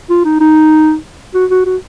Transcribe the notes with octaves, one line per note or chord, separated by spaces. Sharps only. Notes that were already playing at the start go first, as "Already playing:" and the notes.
F4
D#4
D#4
F#4
F#4
F#4